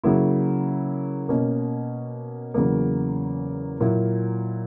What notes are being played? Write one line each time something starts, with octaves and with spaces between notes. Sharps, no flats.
C#3 F#3 A#3 E4
B2 A#3 C#4
E2 C#3 F#3 A#3
A#2 F#3 A#3 E4